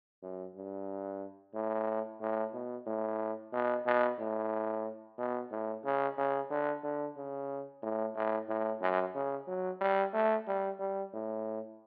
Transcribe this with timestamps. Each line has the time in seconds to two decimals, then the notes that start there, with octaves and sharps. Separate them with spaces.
0.23 F#2
0.55 G2
1.54 A2
2.21 A2
2.53 B2
2.86 A2
3.53 B2
3.86 B2
4.19 A2
5.18 B2
5.51 A2
5.84 C#3
6.18 C#3
6.50 D3
6.83 D3
7.17 C#3
7.83 A2
8.15 A2
8.48 A2
8.82 F#2
9.15 C#3
9.47 F#3
9.81 G3
10.14 A3
10.47 G3
10.79 G3
11.13 A2